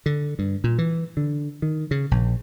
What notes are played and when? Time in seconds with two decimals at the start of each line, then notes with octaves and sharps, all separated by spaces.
0.06 D3
0.39 G2
0.64 A#2
0.78 E3
1.17 D3
1.62 D#3
1.91 C#3
2.11 A#1